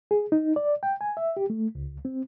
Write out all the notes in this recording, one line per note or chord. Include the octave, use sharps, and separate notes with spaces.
G#4
D#4
D5
G5
G#5
E5
G4
A3
C#2
C4